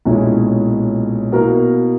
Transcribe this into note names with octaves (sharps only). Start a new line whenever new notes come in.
B1 A#2 G#3 C#4 E4
B2 A#3 E4 A#4